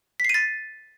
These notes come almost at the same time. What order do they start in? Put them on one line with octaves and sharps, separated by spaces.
B6 C7 D#7 A6